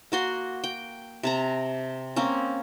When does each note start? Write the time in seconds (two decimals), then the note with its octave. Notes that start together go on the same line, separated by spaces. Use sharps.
0.12 A#3 F#4 C6
0.64 G5
1.23 C3 A5 A#5
2.16 A#3 C4 C#4